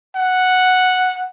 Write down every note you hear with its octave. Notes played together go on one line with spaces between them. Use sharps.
F#5